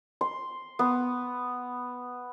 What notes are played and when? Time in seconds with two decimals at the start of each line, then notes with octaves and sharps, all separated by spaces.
0.21 C6
0.79 B3